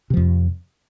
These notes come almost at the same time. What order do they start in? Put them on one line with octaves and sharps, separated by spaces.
C3 F3 F2